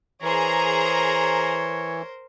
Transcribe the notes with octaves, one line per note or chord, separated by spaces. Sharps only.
E3 G#4 A#4 C5 C#5 A#5